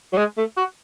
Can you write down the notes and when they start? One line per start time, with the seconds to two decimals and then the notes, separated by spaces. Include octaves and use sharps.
0.13 F#3
0.17 G#3
0.37 A3
0.57 F#4